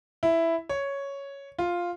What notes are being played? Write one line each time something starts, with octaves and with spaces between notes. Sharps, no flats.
E4
C#5
F4